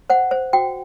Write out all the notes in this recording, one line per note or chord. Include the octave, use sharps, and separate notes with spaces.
C5 F#5
C5
F#4 G5